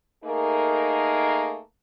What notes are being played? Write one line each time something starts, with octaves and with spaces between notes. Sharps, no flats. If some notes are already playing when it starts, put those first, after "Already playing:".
A3 A#3 D#4 G#4 A#4